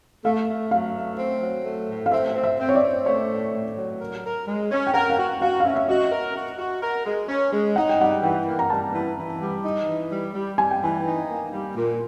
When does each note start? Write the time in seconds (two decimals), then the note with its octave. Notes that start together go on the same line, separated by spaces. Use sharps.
0.24 A3 F5
0.48 A3
0.71 F#3 F5
0.94 A3
1.18 C4
1.41 F#3
1.65 A3
1.89 A2
2.06 F5
2.12 C4 E5
2.35 C4
2.44 E5
2.59 C4
2.69 C#5
2.75 D5
2.83 C4
3.06 A3 C#5
3.30 A2
3.54 A2
3.77 F#3
4.00 A#4
4.24 A#4
4.47 G#3
4.71 C#4
4.87 G5
4.94 A#4 F#5
5.10 F5
5.17 F#4 F#5
5.42 F#4 F5
5.60 F5
5.65 C#4 E5
5.76 E5
5.88 F#4 D#5
6.12 A#4
6.35 F#4
6.59 F#4
6.82 A#4
7.05 G#3
7.29 C#4
7.52 G#3
7.76 D#4 F#5
7.89 G5
8.00 G3 F#5
8.23 E3 G5
8.47 A#3
8.59 A#5
8.70 G3 A5
8.93 E3
9.16 E3
9.41 G3
9.64 D#4
9.88 E3
10.11 G3
10.34 G3
10.58 G3 G#5
10.71 G5
10.82 E3 G#5
11.06 D#4
11.28 A#3
11.51 G3
11.76 A#2